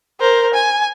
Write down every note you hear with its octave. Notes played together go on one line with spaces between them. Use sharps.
A#4 C5
G#5